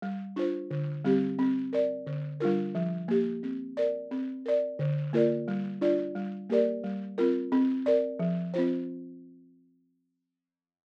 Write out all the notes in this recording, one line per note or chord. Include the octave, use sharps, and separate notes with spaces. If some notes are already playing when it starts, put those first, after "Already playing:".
G3
D4 F4 C5
D3
G3 C4 G4
C4
A#4 D5
D3
G3 D4 F4 A#4
F3
A#3 G4
C4
A#4 D5
C4
A#4 D5
D3
A#3 F4 A#4 D5
G3
D4 F4 D5
G3
A#3 G4 A#4 D5
G3
C4 F4 A#4
C4
A#4 D5
F3
C4 F4 C5